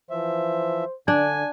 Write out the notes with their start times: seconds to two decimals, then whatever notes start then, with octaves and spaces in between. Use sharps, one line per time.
0.10 E3 F3 C5 E5
1.08 D3 D4 G#5